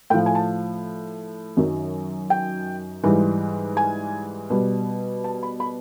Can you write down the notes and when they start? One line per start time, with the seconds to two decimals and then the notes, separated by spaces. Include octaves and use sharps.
0.10 A2 F3 G5
0.26 G#5
0.35 A5
1.57 F#2 D#3 F#3
2.30 G5
3.03 G#2 E3 G3
3.77 G#5
4.50 B2 G3
5.24 A5
5.43 B5
5.60 B5